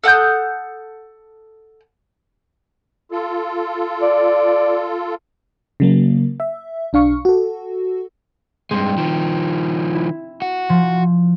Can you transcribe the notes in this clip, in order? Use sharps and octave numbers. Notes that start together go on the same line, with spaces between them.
A4 F#5 D#6 G6
F4 A4
D5
C#3 F#3 A#3
E5
B1 D4 F5 C#6
F#4 A4
G2 G#3 C4
D#3 F3
E4
F#4
F3